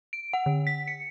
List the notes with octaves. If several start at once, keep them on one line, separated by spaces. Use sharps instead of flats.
D7
F#5
D3
B6
C#7